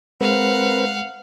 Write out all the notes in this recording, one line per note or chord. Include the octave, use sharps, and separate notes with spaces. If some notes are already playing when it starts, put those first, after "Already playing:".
G#3 C4 A#4 B4 F5 F#5